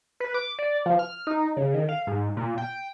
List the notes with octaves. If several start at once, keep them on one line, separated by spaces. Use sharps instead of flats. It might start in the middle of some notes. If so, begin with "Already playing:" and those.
B4
D6
D5
F3
F6
D#4
C#3
D#3
F5
G#2
A#2
G5